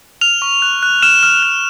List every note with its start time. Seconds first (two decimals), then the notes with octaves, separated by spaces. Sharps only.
0.21 F6 F7
0.42 C#6
0.62 F#6
0.83 F#6
1.03 F6 E7
1.23 F6
1.43 F#6